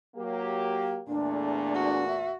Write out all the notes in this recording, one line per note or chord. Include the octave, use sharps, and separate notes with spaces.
F#3 A#3 G4
E2 A#2 A3 D4
F#4
E5